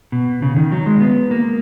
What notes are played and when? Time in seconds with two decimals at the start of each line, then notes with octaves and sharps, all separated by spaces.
0.12 B2
0.42 C#3
0.56 D#3
0.72 F#3
0.86 G#3
1.00 B3
1.31 A#3